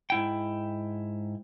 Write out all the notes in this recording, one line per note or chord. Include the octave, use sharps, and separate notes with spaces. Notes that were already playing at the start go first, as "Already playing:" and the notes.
G#2 E4 G5